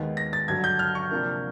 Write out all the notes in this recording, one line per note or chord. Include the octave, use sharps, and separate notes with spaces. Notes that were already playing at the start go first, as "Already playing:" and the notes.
Already playing: D#2 D#3 G#3 B3
A#6
A6
G2 D3 F#3 G#6
G6
F6
C#6
C3 F3 A#3 D4